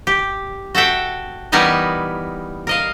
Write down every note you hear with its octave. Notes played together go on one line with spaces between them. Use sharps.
G4
F#4 A4 E5 G5
E3 G3 B3 D#4 A#4 C#5
A#4 D#5 F5